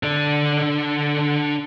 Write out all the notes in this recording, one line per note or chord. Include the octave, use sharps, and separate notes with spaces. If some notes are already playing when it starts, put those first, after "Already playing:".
D3 D4